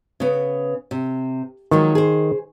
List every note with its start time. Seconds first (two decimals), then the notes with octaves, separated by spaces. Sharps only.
0.20 C#3 B3
0.91 C3
1.71 D#3 F3 F#3 G#3
1.95 G#4 C5